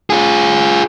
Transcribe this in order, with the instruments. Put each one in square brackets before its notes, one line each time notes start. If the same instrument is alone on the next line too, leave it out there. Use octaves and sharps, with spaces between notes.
[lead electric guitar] F4 G#4